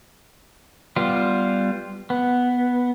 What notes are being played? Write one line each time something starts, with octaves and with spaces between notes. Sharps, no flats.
G3 B3 F4
B3